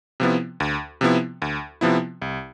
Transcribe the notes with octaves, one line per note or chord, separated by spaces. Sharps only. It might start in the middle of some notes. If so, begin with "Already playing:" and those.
C3 F3 B3 E4
D2
C3 F3 B3 E4
D2
C3 F3 B3 E4
C2